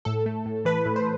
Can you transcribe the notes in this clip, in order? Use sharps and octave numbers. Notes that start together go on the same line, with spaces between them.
A2 A4
A3
A2
E3 B4
A2
C5